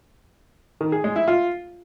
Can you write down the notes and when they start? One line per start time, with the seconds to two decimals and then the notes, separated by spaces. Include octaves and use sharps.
0.81 D#3
0.92 G#4
1.04 G#3
1.16 E4
1.28 F4